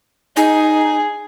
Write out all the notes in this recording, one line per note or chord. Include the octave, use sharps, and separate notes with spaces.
D#4 G#4